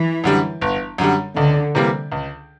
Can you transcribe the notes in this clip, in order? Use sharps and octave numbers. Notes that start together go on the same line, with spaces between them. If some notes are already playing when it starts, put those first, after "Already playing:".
Already playing: E3
F#2 D3 G3
G1
F#2 D3 G3
C#2 D3
C3 E3 G3 A#3
C#2